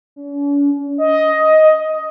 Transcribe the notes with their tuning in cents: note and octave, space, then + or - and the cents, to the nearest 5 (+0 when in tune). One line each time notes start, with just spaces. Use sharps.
C#4 +45
D#5 +10